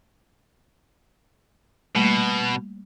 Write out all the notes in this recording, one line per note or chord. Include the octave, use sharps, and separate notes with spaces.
B2 G3 A3 A#3